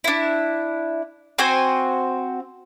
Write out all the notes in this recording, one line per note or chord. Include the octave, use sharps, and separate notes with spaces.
D4 E4
C4 F#4 C5 G#5